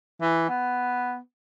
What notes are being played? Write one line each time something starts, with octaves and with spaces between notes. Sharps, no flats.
E3
B3